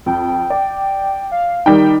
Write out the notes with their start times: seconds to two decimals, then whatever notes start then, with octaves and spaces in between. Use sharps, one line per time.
0.06 F2 G5
0.50 D5
1.32 F5
1.66 D#3 G3 D#4 G5